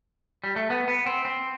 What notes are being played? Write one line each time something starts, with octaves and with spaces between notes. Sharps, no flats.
G3
A3
B3
B3
C4
C4